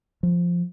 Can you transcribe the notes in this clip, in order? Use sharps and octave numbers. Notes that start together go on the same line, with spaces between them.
F3